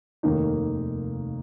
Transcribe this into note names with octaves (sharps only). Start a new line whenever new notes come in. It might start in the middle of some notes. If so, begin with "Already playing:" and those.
F1 D#2 D#3 A#3 D#4